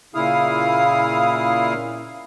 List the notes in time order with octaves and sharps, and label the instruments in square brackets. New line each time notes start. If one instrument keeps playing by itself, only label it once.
[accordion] A#2 C#3 E4 F5 D#6